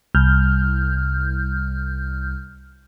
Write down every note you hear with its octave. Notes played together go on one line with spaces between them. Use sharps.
C2 F6 G6